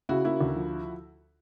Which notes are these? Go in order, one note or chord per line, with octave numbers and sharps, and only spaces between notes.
C#3 E4 F#4
A#3 E4 F#4
D2
F3